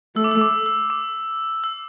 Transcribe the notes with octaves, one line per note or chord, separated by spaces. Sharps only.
A3 E6
D6
E6
D6
E6
D6
E6